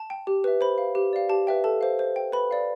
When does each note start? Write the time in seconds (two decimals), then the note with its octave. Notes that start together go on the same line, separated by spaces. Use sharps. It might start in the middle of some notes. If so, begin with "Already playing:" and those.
Already playing: A5
0.10 G5
0.27 G4
0.44 B4 E5
0.61 C5 B5
0.78 F5
0.95 G4
1.13 D5 F5
1.29 G4 A5
1.47 B4 E5 G5
1.64 A4 A5
1.81 C5 F5
1.99 C5
2.16 G5
2.32 B4 B5
2.51 D5 F5